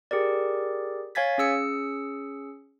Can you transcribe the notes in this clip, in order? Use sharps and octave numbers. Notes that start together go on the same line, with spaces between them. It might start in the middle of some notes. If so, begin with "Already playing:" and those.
G4 G#4 A#4 D5
C#5 F5 G#5 G#6 A6 B6
C#4 G#4 E6 C#7